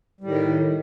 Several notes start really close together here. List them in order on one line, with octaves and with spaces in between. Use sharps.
G3 A2 D#3